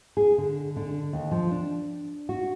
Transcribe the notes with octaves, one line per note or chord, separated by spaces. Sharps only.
G#4
D3
D3
D#2
F3
D4
F#4